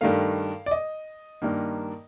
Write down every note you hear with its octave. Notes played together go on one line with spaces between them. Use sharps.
G2 D#3 A3 F5
D5
D#5
G2 D#3 A#3